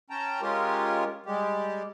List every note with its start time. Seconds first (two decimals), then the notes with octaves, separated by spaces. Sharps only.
0.10 C#4 G5 A5 A#5
0.42 G#3 C#4 F4 G4 A#4
1.26 G3 G#3 G4